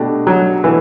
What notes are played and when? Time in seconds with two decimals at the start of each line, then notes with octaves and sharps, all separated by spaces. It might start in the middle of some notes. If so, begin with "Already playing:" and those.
Already playing: B2 A3 D4 G4
0.27 F#3
0.64 B2 E3 A3